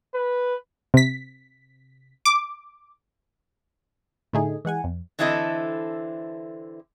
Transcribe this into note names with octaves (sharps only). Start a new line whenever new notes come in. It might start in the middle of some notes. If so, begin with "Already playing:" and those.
B4
C3 B6
D6
A2 D3 A3 D#4 G#4
E3 G#3 F#5 G#5
F2
D3 E3 C4 E4 A4 D#5